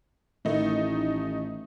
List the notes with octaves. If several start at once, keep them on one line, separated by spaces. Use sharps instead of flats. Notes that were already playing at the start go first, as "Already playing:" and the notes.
A1 A2 D#3 A3 D#4 E4